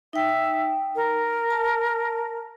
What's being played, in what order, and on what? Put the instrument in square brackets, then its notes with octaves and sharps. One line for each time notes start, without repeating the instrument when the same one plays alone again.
[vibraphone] D#4 G5 [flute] E5
[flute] A#4
[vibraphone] A5